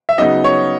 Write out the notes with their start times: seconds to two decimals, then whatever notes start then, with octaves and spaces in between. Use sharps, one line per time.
0.09 E5
0.18 C#3 F#3 B3 D#4 D#5
0.44 C#5